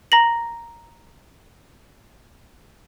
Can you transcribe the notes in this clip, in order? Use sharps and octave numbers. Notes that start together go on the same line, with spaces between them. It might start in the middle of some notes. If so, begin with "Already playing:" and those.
A#5 A#6 F#7